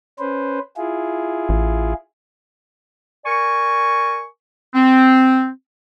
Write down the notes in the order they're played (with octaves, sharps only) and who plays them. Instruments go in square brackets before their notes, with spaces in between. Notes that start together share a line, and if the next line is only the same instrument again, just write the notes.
[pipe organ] C#4 B4 C5
E4 F4 G#4
[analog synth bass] A1
[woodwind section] A#4 D5 G#5 C#6
C4